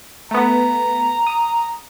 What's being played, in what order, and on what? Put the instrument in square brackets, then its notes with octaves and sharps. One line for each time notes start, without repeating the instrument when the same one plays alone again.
[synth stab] A3 B3 [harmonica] A#5
[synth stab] D#6